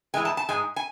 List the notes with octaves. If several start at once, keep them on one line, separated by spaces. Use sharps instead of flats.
A2 E3 G#3 G#5
A5
A5
G#2 G#3 G#5
G#5